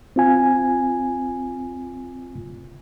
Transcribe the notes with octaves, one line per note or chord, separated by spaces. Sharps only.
C4 F4 G#5